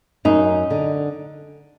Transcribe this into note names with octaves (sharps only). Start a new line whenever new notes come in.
F#2 D#4
D3